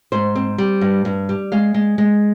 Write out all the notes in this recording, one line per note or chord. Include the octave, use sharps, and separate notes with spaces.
G#2 C5
C4
G3
G2
G2
G3
G#3 F5
G#3
G#3